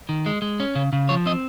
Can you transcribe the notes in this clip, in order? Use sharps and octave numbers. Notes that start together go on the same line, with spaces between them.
D#3
G#3
G#3
C#4
C#3
C#3
F3 C#5
C4 D#5